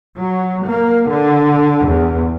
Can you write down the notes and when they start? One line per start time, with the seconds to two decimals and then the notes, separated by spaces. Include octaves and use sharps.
0.17 F#3
0.67 A#3
1.09 D3
1.86 E2